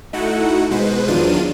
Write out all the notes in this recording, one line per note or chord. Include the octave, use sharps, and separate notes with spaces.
A3 D#4 E4 F#4 F#5
B2 G#3 B4 C5
E2 D#3 F#3 D4 F4 D#7